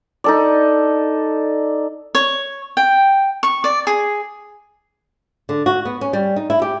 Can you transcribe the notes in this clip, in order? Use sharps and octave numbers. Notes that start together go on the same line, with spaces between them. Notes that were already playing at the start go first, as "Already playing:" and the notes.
D#4 A4 D5
C#5
G5
C#6
D5
G#4
D3
F#4
B3
C#4
G3
D#4
E4
G4